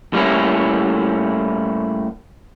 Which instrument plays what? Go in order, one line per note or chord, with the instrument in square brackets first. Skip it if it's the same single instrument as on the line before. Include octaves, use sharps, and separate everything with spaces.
[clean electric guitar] A2 G3 A#3 C#4 E4